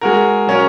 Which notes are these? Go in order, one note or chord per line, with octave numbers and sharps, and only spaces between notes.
G#3 F#4 A#4
F#3 C#4 A#4